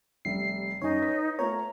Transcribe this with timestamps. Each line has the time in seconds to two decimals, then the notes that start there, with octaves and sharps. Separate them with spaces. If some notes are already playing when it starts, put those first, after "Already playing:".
0.25 F1 G3 E5 C7
0.82 F#2 G3 D#4 C#5 G#5
1.01 B4 B6
1.39 A3 B3 F4 C#5 A#5